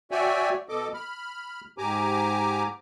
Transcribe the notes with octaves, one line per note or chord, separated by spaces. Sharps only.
F#4 C#5 D5 E5 G5 G#5
B2 A4 D#5 D6
B5 F6
G#2 G4 G#5 A#5 D6